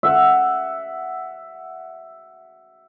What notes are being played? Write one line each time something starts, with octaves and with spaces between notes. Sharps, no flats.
E5 F#5